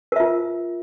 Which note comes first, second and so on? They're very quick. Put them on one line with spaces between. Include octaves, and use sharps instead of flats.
A#4 E5 F4